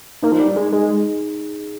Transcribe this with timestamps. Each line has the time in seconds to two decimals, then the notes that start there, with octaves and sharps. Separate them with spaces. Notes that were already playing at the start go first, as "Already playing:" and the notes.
0.22 A#3 D#4
0.32 F3
0.40 G3
0.48 D#4
0.56 G#3
0.72 G#3 G#4